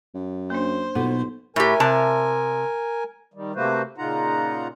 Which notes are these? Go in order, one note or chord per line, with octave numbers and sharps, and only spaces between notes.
F#2
A#3 D4 C5
B1 B2 F4 A4 F#5
A2 G4 A#4 G#5
C3 A5
D#3 G3
C3 A3 A#3 F#4 B4 C5
A#2 C#3 D#4 F4 F#5 A#5